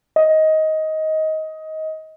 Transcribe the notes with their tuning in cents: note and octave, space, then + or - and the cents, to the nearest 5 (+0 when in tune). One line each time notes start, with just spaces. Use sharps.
D#5 +15